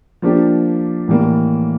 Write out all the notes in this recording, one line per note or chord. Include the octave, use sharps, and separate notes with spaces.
F3 A#3 D4 G4
A2 E3 G3 A#3